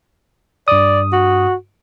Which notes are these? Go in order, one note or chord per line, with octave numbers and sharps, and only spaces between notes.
G2 D5 D#6
F#4